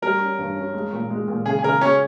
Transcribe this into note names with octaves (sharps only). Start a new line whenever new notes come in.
G3 A#4
C#4
G2
C#4
G#3
A#2
G#3
A#2
C#3 G#4
G#4
C#3 A#4
C#4 G#4 C#5